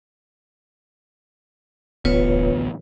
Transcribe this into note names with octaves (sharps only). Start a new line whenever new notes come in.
D#1 A1 D2 B3 F4 B4 C#5